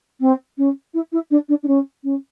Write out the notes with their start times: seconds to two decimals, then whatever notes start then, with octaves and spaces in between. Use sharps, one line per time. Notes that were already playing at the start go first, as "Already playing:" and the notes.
0.20 C4
0.57 C#4
0.94 E4
1.12 E4
1.30 D4
1.48 D4
1.63 D4
1.67 C#4
2.03 C#4